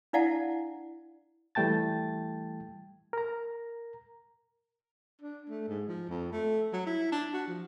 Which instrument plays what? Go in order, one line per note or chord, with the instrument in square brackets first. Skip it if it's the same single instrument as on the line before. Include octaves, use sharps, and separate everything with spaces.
[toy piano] D4 E4 D5 F5 F#5 A5
[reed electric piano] E3 G3 A3 G5 A5 A6
A#4 A#5
[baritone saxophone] D4
A3
G#2
F3
F2
A3
F#3
E4
D4
F#4
F3